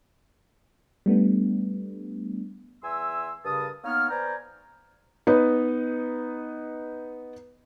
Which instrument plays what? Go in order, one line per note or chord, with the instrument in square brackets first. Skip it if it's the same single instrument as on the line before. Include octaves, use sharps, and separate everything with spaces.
[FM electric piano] G3 A3 B3 D4
[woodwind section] E2 E5 G#5 C6 E6
G2 C#3 A#4 A5 D#6
A#3 B3 D#4 C#5 F6
B4 C5 D5 G5 G#5 A#5
[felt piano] B3 D#4 B4